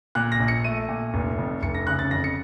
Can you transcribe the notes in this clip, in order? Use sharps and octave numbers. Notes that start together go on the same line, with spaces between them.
A#2 F#6
A#6
A#1
C#7
A3 D#7
A#2
F1
F2
F1 C#7
A#6
C#3 F#6
A6
F2 A#6
C#7